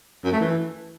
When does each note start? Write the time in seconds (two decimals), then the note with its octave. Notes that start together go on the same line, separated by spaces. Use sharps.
0.24 F#2
0.32 A3
0.40 E3